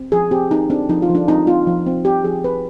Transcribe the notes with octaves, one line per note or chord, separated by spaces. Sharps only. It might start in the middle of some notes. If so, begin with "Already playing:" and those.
Already playing: C4
F3 G#4
C4 G4
C4 D#4
C4 D4
F3 D#4
F4
F3
D4
C4 D#4
C4 F4
F3
C4
C4 G4
F3 G#4
C4 B4